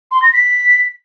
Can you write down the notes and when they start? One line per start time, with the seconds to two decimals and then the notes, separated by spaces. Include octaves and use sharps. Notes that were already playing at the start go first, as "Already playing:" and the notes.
0.11 C6
0.22 A#6
0.33 B6